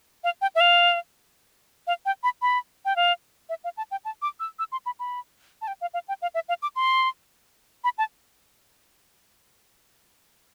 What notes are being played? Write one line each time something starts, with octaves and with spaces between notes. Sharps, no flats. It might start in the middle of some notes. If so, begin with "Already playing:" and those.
F5
G5
E5
F5
F5
G5
B5
B5
G5
F5
E5
F5
A5
G5
A5
D6
E6
E6
C6
B5
B5
A5
G5
F5
F5
G5
F5
E5
F5
D6
C6
B5
A5